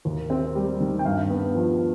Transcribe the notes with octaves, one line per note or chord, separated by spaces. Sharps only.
D#2
C4
G3
D#3
G5
G2 F5
B3
F3